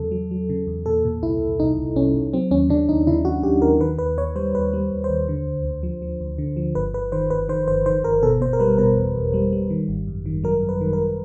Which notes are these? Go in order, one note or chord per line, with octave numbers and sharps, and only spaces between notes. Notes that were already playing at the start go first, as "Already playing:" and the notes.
Already playing: E2 C#3 F#3 A4
F#3
F#3
C#3
E2
A#2 A4
A#2
C2 E4
C2
C2 D#4
C2
C2 C#4
C2
F#3 C4
D#2 C#4
C#3 D4
D#2 D#4
C#3 E4
D#2 F#4
D#2 G4
D#2 A#4
D#3 B4
D#2 B4
D#2 C#5
G3 C5
D#2 B4
G3
D#2
C5
D#2
D3
D2
D2
F3
F3
D2
D3
F3
G1 B4
G1 B4
D#3 C5
G1 B4
D#3 C5
G1 C5
D#3 C5
G1 A#4
B2 A4
B2 C5
A#4
G3 B4
B2 A#4
E2
E2
G3
G3
D#3
G#1
F#2
D#3
F#3 A#4
F#2
B4
D#3
A#4